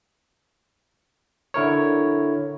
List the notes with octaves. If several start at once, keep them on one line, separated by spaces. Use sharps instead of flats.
D3 E4 A#4 C#5